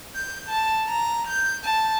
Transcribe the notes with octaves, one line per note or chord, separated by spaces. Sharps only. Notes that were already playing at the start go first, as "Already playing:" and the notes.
G6
A5
A#5
G6
A5